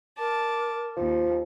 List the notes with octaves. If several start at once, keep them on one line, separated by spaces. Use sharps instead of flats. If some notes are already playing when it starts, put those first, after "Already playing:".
A#4 A5 D6
D#2 F3